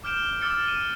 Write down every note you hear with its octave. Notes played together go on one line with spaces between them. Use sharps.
D6 F6 G6 D7 E7 G7
D6 E6 F6 A6 C#7
D#7 E7